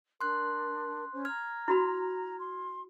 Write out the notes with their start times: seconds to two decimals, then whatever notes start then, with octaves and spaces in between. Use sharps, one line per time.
0.21 D4 A#4 C6 F#6
1.12 C#4 C5
1.25 A#5 F6 G#6
1.68 E4 F#4 B5
2.38 C6